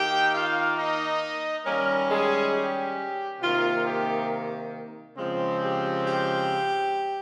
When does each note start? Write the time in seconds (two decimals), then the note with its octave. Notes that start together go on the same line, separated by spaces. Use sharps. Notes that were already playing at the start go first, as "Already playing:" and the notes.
Already playing: D#3 A#3 D#4 G4 G5
0.33 F4 F5
0.76 D#4 D#5
1.65 D#3 G3 A#3 C#4 A#4
2.10 G#3 G#4
2.54 G4
3.41 C3 D#3 A#3 F4
3.86 G4
5.17 C#3 F3 G#3 C4
5.62 G4
6.06 G4